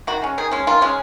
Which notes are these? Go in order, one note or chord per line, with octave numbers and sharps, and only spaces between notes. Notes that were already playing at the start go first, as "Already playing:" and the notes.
D#3 F#4
G#3 C#4
D#3 G#4
G#3 C#4
D#3 F4
G#3 C#4